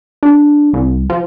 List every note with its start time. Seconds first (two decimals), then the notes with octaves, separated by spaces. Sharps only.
0.23 D4
0.73 C2
1.10 F3